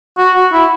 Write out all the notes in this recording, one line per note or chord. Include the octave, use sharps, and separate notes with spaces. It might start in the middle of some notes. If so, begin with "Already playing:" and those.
F#4
F#4
E4